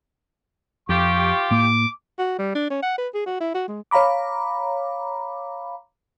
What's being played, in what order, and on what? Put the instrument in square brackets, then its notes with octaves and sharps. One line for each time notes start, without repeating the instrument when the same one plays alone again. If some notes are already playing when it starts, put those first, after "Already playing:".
[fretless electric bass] F2 [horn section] F4 G4 [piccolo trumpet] C#6
[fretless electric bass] A2 A#3 [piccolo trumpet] D6
[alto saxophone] F#4
G3
D4
C#4
F#5
B4
G#4
F#4
E4
F#4
G#3
[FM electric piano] C#5 F5 A#5 B5 D6